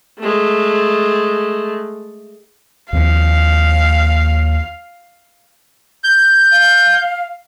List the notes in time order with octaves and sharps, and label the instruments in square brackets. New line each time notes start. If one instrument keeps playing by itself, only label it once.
[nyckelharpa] G#3 A3
[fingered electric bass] D#2 F3 C4 [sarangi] F5
[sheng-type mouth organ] G6
[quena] F5